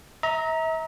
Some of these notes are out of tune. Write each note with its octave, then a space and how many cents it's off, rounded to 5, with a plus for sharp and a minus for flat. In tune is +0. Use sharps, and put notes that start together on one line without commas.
E5 -40 A#5 +0